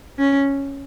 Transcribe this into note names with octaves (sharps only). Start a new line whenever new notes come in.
C#4